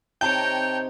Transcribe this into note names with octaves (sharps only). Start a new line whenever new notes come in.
C3 D#4 C#5 G5 A5 A#5 G6